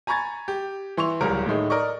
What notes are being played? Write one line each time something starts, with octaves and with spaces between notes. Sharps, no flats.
G#5 A#5 B5 C#6 G#6 A6
G4
E3 C6 C#6 F7
D1 C#2 G3 A#4 A#5
A2 D#3 G#3
A#4 D5 D#5 C#6